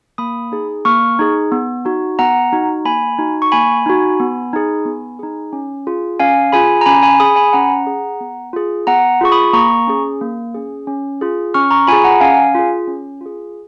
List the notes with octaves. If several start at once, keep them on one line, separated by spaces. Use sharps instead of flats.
A#3 B5 D#6
D#4 G#4
A#3 C#6 F6
D#4 G#4
B3
D#4 F#4
B3 F#5 A#5
D#4 F#4
A#3 G#5 B5
D#4 F#4
C#6
A#3 G#5 B5
D#4 F#4
B3
D#4 G#4
B3
D#4 G#4
C#4
F4 G#4
C#4 F5 G#5
F4 G#4 G#5 B5
A#5
C#4 G#5 B5
G#5 B5
G#4 B5 D#6
G#5 B5
C#4 F#5 A#5
G#4
B3
F4 G#4
B3 F#5 A#5
F4 G#4 C#6
B5 D#6
A#3 A#5 C#6
C#4 G#4
A#3
C#4 G#4
C#4
F4 G#4
C#4 C#6 F6
A#5 C#6
F4 G#4 G#5 B5
F#5 A#5
C#4 F5 G#5
F4 G#4
C#4
F4 G#4